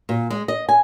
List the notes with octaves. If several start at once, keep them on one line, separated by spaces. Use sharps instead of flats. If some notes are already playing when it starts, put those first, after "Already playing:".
A#2
G#3
D#5
G#5